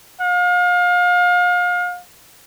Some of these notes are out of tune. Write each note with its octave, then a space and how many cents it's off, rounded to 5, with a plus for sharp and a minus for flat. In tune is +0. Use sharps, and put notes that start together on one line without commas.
F5 +35